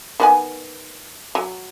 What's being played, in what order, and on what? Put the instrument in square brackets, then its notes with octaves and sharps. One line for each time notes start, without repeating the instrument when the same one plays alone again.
[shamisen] D#3 B3 G#5
F#3